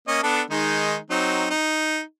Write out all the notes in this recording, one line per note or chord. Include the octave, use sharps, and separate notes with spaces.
A#3 C#4 D#5
B3 D4 A4
D#3 G#3 D#4
F#3 C4 D#4
D#4